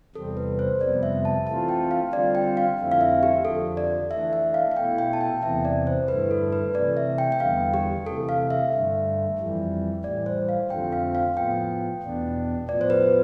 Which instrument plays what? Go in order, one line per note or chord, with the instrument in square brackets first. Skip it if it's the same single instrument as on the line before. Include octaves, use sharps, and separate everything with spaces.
[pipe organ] E2 C3 G3 C4 [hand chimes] A4
[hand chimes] B4
C5
[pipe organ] F2 C3 G3 B3 [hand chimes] D5
[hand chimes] E5
A5
[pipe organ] E3 A3 C4 F4 [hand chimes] A5
[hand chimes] G5
F5
[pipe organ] D3 G3 C4 F4 [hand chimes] D5
[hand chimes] G5
F5
[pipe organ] F2 D3 A3 C4 E4
[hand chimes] F5
E5
G4
[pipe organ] F2 D3 F3 [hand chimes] A4
[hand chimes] D5
[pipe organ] E3 A3 D4 [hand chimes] E5
[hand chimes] E5
F5
F5
[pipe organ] B2 A3 E4 [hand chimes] G5
[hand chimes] G5
A5
G5
[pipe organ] E2 C3 E3 B3 [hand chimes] E5
[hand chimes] D5
C5
[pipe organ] G2 D3 A3 E4 [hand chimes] B4
[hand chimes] A4
B4
[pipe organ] C3 E3 A3 [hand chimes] D5
[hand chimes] E5
G5
G5
[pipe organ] E2 D3 G3 B3 [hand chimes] F5
[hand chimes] G4
[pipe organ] C3 E3 A3 [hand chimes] A4
[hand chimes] F5
E5
[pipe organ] G2 D3 A3
F2 E3 G3
[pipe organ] A2 E3 G3 [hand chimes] D5
[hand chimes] C5
F5
[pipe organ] F2 D3 F3 A3 C4 [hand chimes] G5
[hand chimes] F5
F5
[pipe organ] A2 F3 B3 [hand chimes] G5
[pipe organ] E2 B2 B3 D4
[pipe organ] A2 F3 B3 [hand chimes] D5
[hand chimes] C5
B4